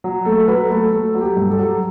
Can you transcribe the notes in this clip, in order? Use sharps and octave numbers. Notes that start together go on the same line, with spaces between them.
F#3
A3 A4
F#3 B4
A3 A4
A3 A4
F#3
G4
G2
A4
F#3